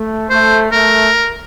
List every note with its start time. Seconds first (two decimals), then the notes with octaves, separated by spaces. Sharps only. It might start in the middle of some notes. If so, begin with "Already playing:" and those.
Already playing: A3
0.30 A3 C5
0.72 A3 A#4